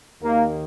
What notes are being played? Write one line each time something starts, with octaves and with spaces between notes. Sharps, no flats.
D#2 D#3 A#3